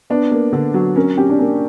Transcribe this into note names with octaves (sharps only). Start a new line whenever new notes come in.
B3 D4
A#3
D3
F#3
C#4 A#4
C#4 G4
D4
A#3 C#4